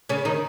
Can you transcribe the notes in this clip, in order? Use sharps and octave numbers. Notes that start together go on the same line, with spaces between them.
C#3 C#4
D#3 D#4